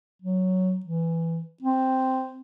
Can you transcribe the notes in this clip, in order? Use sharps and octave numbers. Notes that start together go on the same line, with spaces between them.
F#3
E3
C4